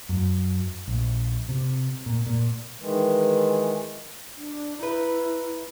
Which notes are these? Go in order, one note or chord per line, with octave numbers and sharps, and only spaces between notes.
F#2
A#1
C3
A#2
A#2
D#3 E3 G#3
D4
D#4 E4 B4